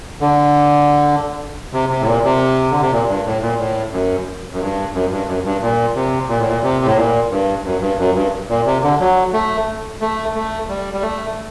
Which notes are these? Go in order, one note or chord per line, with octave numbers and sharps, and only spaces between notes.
D3
C3
C3
A2
A#2
C3
D3
C3
A#2
G2
A2
A#2
A2
F#2
F#2
G2
F#2
G2
F#2
G2
A#2
C3
A#2
A2
A#2
C3
A2
A#2
G2
F#2
G2
F#2
G2
A#2
C3
D3
F#3
A3
A3
A3
G3
G3
A3